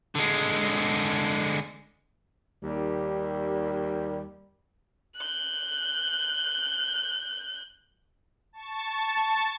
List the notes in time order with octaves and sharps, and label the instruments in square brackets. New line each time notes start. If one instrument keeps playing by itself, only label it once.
[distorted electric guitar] D3 G#3
[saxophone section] D#2 G3
[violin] F#6 G6
[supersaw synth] A5 C#6 A6